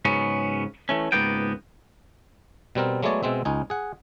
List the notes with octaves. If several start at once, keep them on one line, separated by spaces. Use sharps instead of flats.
G#2 C#3 F#3 B3 C#4
E3 A3 C#4
C#2 G#2 A#3 B3 G5
B2 G3 C4 A#4
F#3 G#3 A3 B3 C#5 D5
B2 G#3 C4 E5
C#2 D#4 G#5
G#4 F#5